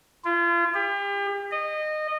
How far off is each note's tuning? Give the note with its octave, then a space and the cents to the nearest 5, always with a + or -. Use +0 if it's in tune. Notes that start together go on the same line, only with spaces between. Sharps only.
F4 -35
G4 +40
D#5 -20